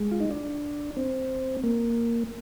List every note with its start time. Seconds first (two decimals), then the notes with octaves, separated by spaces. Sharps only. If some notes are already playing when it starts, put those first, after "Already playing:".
Already playing: G#3
0.11 F4
0.20 D#4
0.31 D4
0.97 C4
1.64 A#3